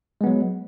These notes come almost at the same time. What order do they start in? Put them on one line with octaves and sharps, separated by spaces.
G#3 B3 F#3